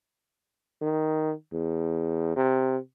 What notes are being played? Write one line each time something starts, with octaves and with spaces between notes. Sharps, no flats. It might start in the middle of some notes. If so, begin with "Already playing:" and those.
D#3
E2
C3